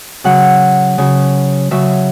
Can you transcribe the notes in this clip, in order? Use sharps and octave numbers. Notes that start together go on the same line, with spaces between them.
C#3 F#3 F#5
C#3 F#3
C#3 F#3 E5